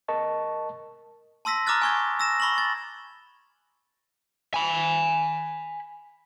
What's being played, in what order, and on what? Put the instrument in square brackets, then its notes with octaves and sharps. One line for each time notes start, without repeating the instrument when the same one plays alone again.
[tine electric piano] A#4 D#5 A5 C#6
[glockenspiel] A5 C6 E6 A#6 B6
A#5 D6 D#6 F6 F#6 A6
G#5 C#6 G#6
E6 A#6 E7
B5 C#6 A#6 F#7
A6
[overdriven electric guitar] G#5 B5